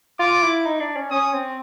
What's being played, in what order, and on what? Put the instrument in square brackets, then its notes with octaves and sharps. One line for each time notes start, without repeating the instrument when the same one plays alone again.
[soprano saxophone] F4 [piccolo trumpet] D6
[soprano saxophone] E4
D#4
D4
C#4
[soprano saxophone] C#4 [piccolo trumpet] D#6
[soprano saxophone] C4